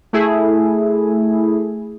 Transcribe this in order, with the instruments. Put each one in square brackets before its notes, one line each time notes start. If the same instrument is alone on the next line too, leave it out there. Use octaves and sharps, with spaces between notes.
[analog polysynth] A3 E4 G#4